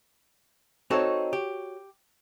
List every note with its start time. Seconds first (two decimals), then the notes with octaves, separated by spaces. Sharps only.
0.90 C4 D#4 F#4 A4 C#5
1.33 G4